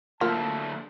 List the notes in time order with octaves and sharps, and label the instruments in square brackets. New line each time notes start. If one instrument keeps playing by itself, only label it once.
[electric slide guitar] D3 F#3 A3 [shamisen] A#3 [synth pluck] F4 [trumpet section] A5